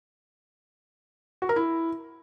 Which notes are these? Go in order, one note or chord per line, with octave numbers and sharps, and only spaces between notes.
F#4
A#4
E4